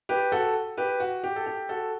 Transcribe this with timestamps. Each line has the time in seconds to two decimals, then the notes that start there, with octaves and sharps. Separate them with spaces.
0.09 G4 B4
0.32 F#4 A4
0.77 G4 B4
1.00 F#4
1.24 G4
1.36 A4
1.46 G4
1.69 F#4 A4